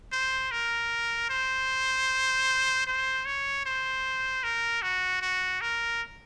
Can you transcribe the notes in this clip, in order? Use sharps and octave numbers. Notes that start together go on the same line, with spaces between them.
C5
A#4
C5
C5
C#5
C5
A#4
F#4
F#4
A#4